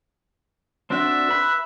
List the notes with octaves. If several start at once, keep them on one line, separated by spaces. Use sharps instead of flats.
C4 D4 F#4 E5
B4 B5 F#6